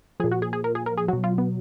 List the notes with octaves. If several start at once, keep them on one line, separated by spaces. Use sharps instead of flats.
A#2 F3 G#4
F#4
G#4
G#4
A#4
G#4
A#4
G#4
B2 F#3 F#4
F4
B3